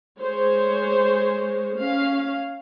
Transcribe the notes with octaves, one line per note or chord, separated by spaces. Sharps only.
G#3 C5 C#5
C#4 F5